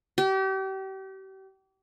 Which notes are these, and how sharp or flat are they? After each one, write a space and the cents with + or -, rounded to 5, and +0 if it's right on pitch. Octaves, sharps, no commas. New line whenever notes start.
G4 -35